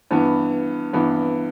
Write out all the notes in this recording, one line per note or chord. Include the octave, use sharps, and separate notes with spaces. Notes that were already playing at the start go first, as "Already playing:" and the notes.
G2 E3 B3
G2 E3 B3